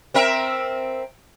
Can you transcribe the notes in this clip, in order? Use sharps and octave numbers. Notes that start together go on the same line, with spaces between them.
C4 A#4 E5